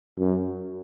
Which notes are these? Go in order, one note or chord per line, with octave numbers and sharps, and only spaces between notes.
F#2